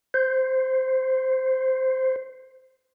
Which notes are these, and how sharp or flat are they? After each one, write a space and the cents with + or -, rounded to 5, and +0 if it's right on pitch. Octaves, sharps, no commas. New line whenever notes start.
C5 -5